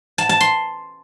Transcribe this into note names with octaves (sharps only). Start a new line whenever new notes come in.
A5
A5
C6